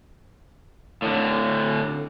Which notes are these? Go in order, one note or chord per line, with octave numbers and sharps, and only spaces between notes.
A2 D3